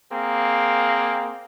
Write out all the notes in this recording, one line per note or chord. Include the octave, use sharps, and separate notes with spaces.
A#3 C4 G#4